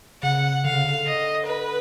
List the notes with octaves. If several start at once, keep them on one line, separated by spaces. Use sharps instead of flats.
C#3 F#5
D3 F5
C#3
D3
D#5
B4